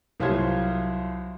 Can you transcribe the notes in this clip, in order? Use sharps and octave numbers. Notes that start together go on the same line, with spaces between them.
C2 F#3 F4 G4 C5 G#6